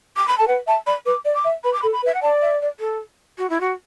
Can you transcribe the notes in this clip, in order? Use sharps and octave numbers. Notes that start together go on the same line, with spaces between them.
D6
B5
A4 A5
B4 F#5
E5 A5
D5 B5
B4 D6
D5
D6
E5
B4 B5
D6
A4 B5
B5
B4
E5
F#5
D5 A5
E5
D5
A4
F#4
E4
F#4